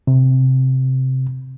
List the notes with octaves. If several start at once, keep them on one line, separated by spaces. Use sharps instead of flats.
C3